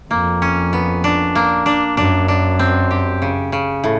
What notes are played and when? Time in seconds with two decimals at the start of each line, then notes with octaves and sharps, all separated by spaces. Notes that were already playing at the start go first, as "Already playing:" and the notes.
0.11 F2 A#3
0.42 C#4
0.73 B3
1.04 D4
1.35 A#3
1.66 D4
1.97 F#2 D4
2.28 D4
2.59 C4
2.91 G4
3.22 C#3
3.52 C#3
3.84 A2